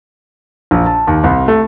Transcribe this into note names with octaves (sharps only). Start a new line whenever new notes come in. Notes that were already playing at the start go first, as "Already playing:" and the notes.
A#1
A5
D#2
C2
A3